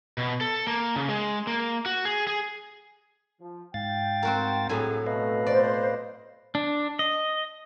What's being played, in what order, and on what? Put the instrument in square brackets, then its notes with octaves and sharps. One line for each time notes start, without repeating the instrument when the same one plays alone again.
[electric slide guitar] B2
A4
A#3
C#3
G#3
A#3
F#4
G#4
G#4
[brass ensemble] F3
[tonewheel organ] G#2 F5 A6 [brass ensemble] G5
[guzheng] C4 F#4 A#4
[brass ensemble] C2 A3 G#4 [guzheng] A2 F#3 G#5
[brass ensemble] B2 A3 [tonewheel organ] B4 D#5 F5
[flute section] C5 [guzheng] D5
[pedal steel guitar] D4
D#5